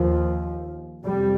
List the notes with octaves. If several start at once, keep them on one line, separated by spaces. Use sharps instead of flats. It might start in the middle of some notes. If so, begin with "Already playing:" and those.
Already playing: D#2 F3
F2 C3 G3